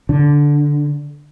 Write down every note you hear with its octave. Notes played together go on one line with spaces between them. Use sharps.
D3